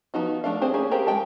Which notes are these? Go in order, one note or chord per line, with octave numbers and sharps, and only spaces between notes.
F3 B3 D#4 F#4
F3 A3 D4 A4 F5
C4 G#4 C5
A#3 C#4 G#4
G4 G#4 A#4 C5 F5
G#3 D#4 G5 A5